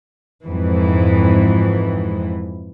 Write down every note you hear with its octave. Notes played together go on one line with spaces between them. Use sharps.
F2 G#2 E3